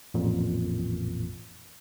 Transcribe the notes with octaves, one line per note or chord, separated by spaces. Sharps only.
A1 F2 A#2